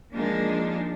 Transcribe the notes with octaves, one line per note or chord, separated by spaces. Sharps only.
F3 G#3 A#3 D4 D#4